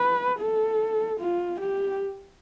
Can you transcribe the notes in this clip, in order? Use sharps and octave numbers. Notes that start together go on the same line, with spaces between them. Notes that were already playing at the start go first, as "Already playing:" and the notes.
Already playing: B4
A4
F4
G4